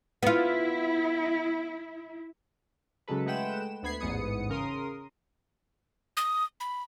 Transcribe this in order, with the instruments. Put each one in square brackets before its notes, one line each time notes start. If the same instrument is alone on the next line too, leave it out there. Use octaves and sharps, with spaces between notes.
[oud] B3 F4 [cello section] E4
[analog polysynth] C#3 F#3 G#3 A4 B4
G#3 A3 B4 F#5 G5 E7
D2 B3 B5 G#6 C7
A1 E2 G#2 B3 D#6 C#7
C#3 A#4 C6 D#6
[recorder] D#6
B5